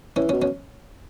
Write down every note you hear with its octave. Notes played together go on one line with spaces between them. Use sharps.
E3 C#4
C#4
B2
C#4